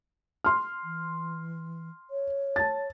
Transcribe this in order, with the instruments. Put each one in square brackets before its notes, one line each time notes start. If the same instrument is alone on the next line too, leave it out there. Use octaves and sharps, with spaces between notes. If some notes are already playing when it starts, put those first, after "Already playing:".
[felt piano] C6 F6
[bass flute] E3
C#5
[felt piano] A5 A6